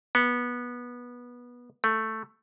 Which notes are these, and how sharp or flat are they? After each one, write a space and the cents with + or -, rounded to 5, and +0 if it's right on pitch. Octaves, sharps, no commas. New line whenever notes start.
B3 -20
A3 +5